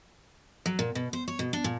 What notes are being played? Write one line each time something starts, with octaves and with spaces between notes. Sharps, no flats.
F#3
A#2
B2
C5
C#5
B2
D4
A#2